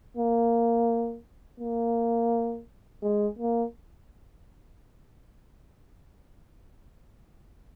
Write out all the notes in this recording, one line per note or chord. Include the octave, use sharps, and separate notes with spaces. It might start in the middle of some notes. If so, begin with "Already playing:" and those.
A#3
A#3
G#3
A#3